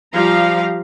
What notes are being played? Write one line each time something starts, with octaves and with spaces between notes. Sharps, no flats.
F3 G3 G4 F5 A#5